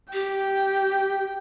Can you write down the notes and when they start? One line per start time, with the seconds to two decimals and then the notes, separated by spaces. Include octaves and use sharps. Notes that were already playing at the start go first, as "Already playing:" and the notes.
0.13 G4 G5